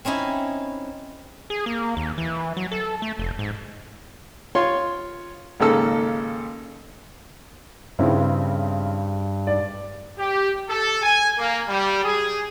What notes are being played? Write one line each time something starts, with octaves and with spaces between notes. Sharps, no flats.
C4 C#4 D#4 E4
G#4
A#3
D#2
E3
F#3
A4
A3
F1
G#2
F4 C#5 C6
G#1 C#3 A#3 A4 E6
G2 C#3 C4 E4
D5
G4
A4
G#5
A#3
G3
G#4